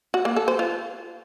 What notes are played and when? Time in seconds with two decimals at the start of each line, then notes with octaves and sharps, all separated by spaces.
0.14 F#4
0.25 A#3
0.36 A4
0.48 C5
0.59 F4